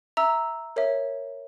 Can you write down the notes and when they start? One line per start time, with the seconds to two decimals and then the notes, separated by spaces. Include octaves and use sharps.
0.17 E5 A#5 E6
0.76 A#4 C#5 E5